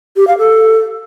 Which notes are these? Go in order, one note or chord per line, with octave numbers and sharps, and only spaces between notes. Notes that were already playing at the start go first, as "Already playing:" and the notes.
G4
F5
A4